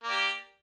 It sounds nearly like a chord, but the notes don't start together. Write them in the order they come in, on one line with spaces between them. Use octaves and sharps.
A#3 D5 G4